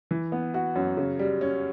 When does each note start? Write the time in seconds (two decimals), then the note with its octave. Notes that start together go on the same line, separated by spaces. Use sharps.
0.11 E3
0.32 B3
0.54 F#4
0.76 F#2
0.97 C#3
1.19 G3
1.41 C#4